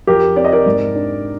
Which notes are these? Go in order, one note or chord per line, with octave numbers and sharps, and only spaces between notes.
F2 G4 A#4
C4 D5
D#5
A#4 D5
G#2
D4